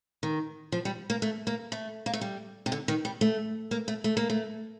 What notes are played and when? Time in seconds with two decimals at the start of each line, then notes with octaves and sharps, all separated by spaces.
0.23 D#3
0.72 F3
0.85 G3
1.10 A#3
1.22 A3
1.47 A#3
1.72 A3
2.06 A#3
2.13 A3
2.21 G3
2.66 C3
2.72 D3
2.88 D#3
3.05 G3
3.21 A3
3.71 A#3
3.88 A3
4.04 A3
4.17 A#3
4.30 A3